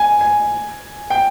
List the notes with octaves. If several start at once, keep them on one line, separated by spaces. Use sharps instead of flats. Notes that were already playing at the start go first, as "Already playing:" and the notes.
Already playing: G#5
G#5
G5